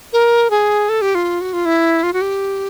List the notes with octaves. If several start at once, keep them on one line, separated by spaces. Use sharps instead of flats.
A#4
G#4
A4
G4
F4
F#4
F4
E4
F4
F#4
G4